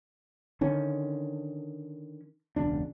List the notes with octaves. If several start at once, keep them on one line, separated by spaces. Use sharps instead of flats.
D3 D#3 C#4
E1 C#2 D4